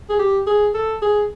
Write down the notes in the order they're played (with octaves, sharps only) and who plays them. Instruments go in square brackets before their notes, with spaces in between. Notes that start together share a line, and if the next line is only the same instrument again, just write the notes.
[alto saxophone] G#4
G4
G#4
A4
G#4